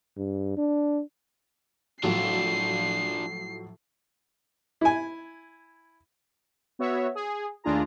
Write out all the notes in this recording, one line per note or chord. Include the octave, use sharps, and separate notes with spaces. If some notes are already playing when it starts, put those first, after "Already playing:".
G2
D4
A2 F3 F#3 D4 F4 C7
E4 G#5
B3 F#4 C#5 E5
G#4
D#2 A3 D4 F4 G#4 A#5